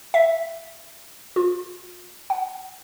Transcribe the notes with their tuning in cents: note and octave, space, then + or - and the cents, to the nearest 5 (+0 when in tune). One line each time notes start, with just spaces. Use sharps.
E5 +5
F4 +45
F#5 +20